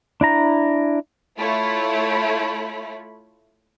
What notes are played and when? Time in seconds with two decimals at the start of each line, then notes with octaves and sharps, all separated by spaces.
0.21 D4 E4 A#5
1.38 A3 E4 F4 C#5 B5